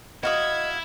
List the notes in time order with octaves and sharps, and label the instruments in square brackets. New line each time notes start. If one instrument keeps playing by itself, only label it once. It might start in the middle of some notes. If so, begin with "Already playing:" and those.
[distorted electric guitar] E4 [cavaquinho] F#4 F5 D#6 [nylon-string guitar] D#5 [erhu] G#6